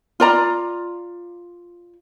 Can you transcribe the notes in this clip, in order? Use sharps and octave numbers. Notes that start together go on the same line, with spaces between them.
F4 D5 A#5